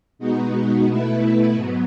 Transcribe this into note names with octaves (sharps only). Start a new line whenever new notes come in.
B2 G#3 B3 D#4 F#4
B2 A3 E4 B4
G#2 F#3 B3